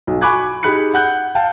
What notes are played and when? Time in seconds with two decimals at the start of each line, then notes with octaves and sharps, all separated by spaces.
0.07 B1
0.21 G#5 B5 C#6 D6 F#6 G#6
0.63 D#4 G4 G#4 B5 F#6 C#7
0.94 F#5 F#6 G6
1.35 F5 G5 A5